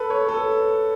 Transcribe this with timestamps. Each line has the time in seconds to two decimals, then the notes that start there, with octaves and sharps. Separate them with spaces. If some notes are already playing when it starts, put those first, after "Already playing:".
Already playing: A4 B4
0.10 C#5
0.28 A4